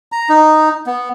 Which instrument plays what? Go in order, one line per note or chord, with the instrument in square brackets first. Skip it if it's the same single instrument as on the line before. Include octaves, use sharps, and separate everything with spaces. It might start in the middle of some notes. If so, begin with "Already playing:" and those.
[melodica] A#5
D#4
B3